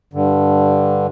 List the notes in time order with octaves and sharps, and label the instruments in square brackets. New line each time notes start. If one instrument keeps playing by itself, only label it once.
[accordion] G2 D3